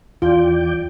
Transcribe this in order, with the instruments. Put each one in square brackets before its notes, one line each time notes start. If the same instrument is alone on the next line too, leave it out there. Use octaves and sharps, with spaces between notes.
[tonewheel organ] E2 D5 G5 [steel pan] F4